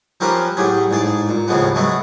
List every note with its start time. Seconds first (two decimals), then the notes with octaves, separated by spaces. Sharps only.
0.20 F3 C4 C#4 G4 A#4 B4
0.57 A2 F#3 G4 G#4
0.91 A1 G#2 G#4 A5 D6
1.29 A#2
1.48 D#2 A2 C#3 F3 G#3 B3
1.75 C#3 F#3 G#3 A3 B3